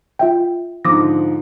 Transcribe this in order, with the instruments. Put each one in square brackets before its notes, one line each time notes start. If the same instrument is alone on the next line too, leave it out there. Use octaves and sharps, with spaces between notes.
[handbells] F4 E5 G5
[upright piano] G#2 D3 F3 [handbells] D6 D#6 A#6